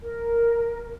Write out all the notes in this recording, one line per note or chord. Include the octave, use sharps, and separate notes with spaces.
A#4